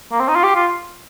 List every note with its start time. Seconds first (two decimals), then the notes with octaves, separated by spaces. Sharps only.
0.12 A#3
0.20 C4
0.28 D#4
0.36 F4
0.44 G4
0.55 F4